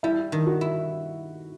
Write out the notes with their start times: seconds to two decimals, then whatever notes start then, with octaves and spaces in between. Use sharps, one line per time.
0.03 G3 E4
0.32 D#3
0.46 F#4
0.61 E4